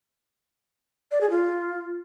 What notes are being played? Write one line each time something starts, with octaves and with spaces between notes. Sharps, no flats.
D5
G#4
F4